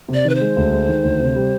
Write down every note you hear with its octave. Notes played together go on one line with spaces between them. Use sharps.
C3
D5
D#3 B4
C5
G#3
D2
G#3
D#3
D2
C3
G3